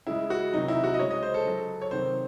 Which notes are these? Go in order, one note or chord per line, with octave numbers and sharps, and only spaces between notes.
C#3 G#3 E4
F#4
C3 D#3 F#3 D#4
E4
F#4
D#5
C#3 G#3 C#5
D#5
C5
A4
C#3 F#3
C#5
C3 D#3 F#3 C5